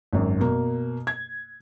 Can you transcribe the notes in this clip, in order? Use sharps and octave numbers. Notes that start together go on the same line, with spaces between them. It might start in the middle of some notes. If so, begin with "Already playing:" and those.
G#1 F#2
B2 A#3
G#6